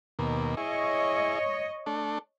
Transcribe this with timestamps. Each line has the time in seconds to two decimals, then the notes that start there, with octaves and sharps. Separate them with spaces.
0.19 D#2 B2 A#3
0.57 E4 G#4 C#5 D#5
1.86 A3 D4 A4